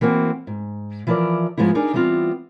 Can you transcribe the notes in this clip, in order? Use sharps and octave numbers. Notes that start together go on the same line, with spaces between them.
E3 A#3 C4 F#4
G#2
E3 F3 E4 A#4 D5
G#2 F3 G#3 B3 E4
D4 D#4 G#4 A#4
E3 G3 B3 C4 F4